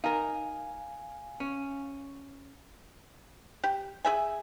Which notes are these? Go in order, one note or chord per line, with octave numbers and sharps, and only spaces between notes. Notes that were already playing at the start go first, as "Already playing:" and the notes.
D#4 A#4 F5 G#5
C#4
G4
G#4 E5 G#5